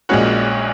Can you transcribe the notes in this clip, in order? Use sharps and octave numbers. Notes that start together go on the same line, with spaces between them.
A#1 A#2 G#3 C#4 F#4